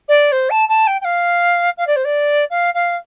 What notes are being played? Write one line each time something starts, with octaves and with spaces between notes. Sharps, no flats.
D5
C5
A5
A5
G5
G5
F5
F5
D5
C5
D5
F5
F5